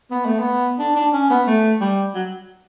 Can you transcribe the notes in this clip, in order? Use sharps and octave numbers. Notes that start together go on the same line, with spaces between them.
B3
A3
B3
D4
D4
C#4
B3
A3
G3
F#3